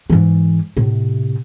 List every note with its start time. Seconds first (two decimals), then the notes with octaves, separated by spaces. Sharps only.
0.10 G#2 E3
0.77 A2 C3